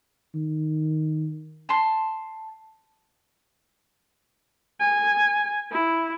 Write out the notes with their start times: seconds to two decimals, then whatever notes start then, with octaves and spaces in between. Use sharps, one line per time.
0.35 D#3
1.69 A5 C6
4.80 G#5
5.72 E4